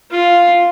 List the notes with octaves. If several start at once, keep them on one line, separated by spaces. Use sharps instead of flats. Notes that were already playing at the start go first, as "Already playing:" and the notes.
F4